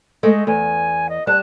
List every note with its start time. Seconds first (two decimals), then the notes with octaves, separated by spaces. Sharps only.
0.23 G#3 A3 D#5
0.47 E2 G#5
1.09 D#5
1.27 G3 A5 F#6